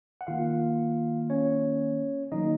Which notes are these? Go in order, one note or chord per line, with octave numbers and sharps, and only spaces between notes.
F#5
D#3 A#3 F4 F5
C#4 C#5
D#3 F#3 A#3 D#4 D#5